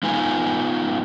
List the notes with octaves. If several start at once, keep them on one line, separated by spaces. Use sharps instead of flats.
G#3 B3 D#4 F4 B4 G#5